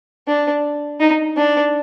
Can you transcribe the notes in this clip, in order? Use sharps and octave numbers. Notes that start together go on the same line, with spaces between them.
D4
D#4
D4